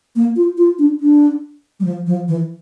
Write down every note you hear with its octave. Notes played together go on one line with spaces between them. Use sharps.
A#3
F4
F4
D4
D4
G3
F3
F3
E3